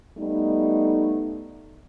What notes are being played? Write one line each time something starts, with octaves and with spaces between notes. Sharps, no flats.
G3 A3 B3 D#4